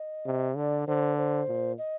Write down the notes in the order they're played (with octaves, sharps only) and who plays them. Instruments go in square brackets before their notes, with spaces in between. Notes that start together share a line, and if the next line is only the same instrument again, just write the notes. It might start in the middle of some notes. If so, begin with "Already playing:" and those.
Already playing: [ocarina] D#5
[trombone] C3
[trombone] D3 [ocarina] D5
[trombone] D3 [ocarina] C5
[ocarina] C5
[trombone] A#2
[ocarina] D#5